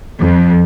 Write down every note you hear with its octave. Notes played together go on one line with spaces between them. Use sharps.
F2